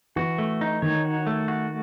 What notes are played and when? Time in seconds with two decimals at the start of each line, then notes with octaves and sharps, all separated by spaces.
0.16 E3 F#4
0.38 A3
0.61 D#4
0.82 D#3 C#5
1.05 F#4
1.27 A3
1.48 F#4